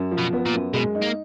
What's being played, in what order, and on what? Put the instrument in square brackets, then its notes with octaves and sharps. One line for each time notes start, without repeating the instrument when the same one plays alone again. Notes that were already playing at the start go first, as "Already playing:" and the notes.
Already playing: [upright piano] F#2
F3
[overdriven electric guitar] B2
[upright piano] B3
[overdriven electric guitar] A#2
[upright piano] F#2
[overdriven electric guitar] B2 [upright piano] G#3
[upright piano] D#4
[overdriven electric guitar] A#3